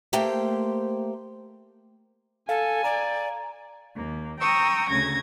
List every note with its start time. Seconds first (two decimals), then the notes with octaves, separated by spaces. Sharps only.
0.13 A3 A#3 G4 C5 G5
2.49 A4 F5 G#5
2.84 D5 A#5
3.95 D#2 A#3
4.39 G5 A#5 C#6 D#6 E6
4.88 D2 C#3 G#6 A#6